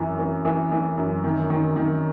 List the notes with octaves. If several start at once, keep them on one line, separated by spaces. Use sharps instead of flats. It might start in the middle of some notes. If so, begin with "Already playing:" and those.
Already playing: F#2 E3
E3
E3
E3
F#2
D#3
D#3
D#3